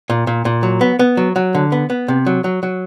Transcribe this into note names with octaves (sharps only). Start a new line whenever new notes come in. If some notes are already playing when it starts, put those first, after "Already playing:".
A#2
A#2
A#2
F#3
B3
B3
F#3
F#3
D3
B3
B3
C3
F#3
F#3
F#3